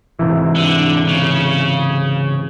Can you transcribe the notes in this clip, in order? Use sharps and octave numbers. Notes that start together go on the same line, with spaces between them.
G#2 C3 E3
D3
C#3